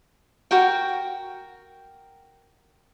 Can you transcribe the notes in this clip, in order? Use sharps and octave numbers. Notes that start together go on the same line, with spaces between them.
F#4 A#4 G5